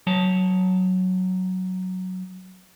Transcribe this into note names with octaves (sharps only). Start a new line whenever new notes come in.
F#3 C#5 A5